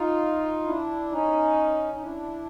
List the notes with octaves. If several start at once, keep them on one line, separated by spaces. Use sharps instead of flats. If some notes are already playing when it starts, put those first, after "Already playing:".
Already playing: D#4 F4
D4 E4
C#4 D#4
D#4
D4 E4